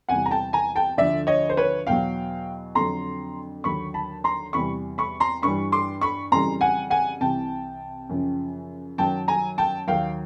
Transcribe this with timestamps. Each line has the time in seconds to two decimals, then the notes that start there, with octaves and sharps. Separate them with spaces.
0.09 E2 C3 E3 G3 F#5 G#5
0.26 A#5
0.31 G5 A5
0.53 G#5 A#5
0.75 G5 A5
0.98 D2 D3 F3 D5 E5
1.27 C#5 D#5
1.49 C5
1.57 B4 C#5
1.87 E2 B2 F#3 F5 G5
2.75 F2 D3 F#3 A#5 C6
3.64 D#2 D3 F#3 B5 C#6
3.94 A5 B5
4.24 A#5 C6
4.53 E2 C3 E3 G3 B5 C#6
4.98 B5 C#6
5.20 A#5 C6
5.42 G2 E3 G3 B5 C#6
5.72 C6 D6
6.01 B5 C#6
6.32 F2 C#3 E3 G3 A#5 C6
6.61 F#5 G#5
6.90 F#5 G#5
7.21 C2 C3 E3 G5 A5
8.09 F#2 C#3 F3
8.98 F#2 D#3 F#3 G5 A5
9.28 G#5 A#5
9.58 G5 A5
9.87 D#2 D#3 F#3 F5 G5